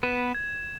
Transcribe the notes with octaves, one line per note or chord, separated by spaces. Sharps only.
B3 B4 E7
G#6